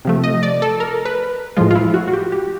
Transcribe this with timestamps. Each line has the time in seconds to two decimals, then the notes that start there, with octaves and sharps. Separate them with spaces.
0.05 C3 F3 A3
0.24 D#5
0.43 D5
0.62 A4
0.80 A#4
1.05 B4
1.56 A2 F3 G#3 F4
1.70 F4
1.75 E4
1.94 F#4
2.08 F#4
2.13 G4
2.32 G4